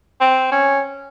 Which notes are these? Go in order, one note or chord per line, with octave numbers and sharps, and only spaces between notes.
C4
C#4